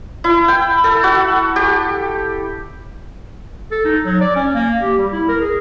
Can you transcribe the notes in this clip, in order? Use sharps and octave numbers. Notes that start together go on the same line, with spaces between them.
E4
G5
A4
F#4
G4
A4
D#4
F#3
D5
C#4
A#3
G4
G3
E4
A#4
G#4